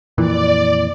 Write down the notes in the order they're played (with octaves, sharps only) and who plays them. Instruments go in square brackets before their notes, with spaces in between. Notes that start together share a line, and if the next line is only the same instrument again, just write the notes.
[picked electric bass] F2 A#2 E3 [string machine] D5